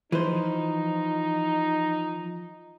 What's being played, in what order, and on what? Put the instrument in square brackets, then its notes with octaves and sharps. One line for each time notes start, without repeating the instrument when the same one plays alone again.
[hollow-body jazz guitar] E3 B4 C5 [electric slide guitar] F3 [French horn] D#4